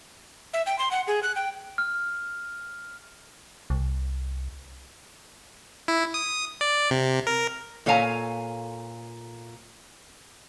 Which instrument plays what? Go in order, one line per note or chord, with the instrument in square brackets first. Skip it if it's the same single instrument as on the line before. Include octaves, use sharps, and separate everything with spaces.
[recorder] E5
G5
C6
F#5
G#4
F#6
G5
[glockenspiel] F6
[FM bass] C2
[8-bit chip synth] E4
D#6
D5
C3
A#4
[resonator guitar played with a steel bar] A#2 A4 C#5 F5 G#5 A#5